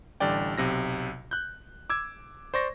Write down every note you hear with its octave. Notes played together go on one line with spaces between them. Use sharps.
A1 D3 G3 D5 G5
B1 C3 A#6
F#6 G6
D6 E6 G#6
C5 D5 C#6 A#6